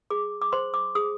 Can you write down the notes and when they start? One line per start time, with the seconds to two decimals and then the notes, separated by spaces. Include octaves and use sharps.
0.10 G#4 D6
0.41 D6
0.52 C5 C6
0.74 D6
0.95 G#4 D#6